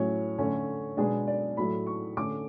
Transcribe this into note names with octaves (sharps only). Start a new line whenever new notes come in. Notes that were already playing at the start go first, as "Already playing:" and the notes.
Already playing: A2 F#3 C#4 C#5
D3 A3 C#4
B2 G#3 B3 D4 G#4
D5
A2 F#3 A3 B5
C#6
D3 A3 C#4 D6